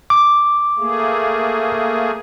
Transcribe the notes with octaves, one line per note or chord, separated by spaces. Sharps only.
D6
A3 A#3 G#4